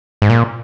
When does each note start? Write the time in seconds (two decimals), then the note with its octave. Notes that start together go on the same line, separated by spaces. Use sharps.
0.22 G#2
0.29 A#2